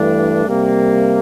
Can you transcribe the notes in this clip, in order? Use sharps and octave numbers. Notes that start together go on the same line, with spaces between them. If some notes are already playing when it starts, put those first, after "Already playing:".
Already playing: G2 E3 A3 D4
C3 G3 A#3